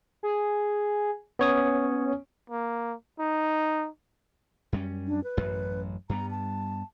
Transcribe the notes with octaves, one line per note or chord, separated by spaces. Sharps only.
G#4
B3 C#4 C#5 D#6
A#3
D#4
F#2 G3 C#4
D4
B4
A1 F#2
G2 G3 B3 A#5
A5